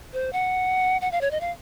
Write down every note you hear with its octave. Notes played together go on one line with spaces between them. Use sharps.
C5
F#5
F#5
F5
C#5
D#5
F5